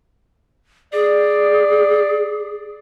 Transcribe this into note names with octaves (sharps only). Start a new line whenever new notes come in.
G#4 D5